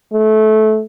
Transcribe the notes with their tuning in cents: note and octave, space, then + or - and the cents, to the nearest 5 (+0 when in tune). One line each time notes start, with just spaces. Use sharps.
A3 -20